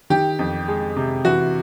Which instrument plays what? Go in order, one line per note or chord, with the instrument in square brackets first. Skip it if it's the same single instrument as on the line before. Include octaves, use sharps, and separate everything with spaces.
[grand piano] D#3 G4
F2
G#3
C3
E3 F#4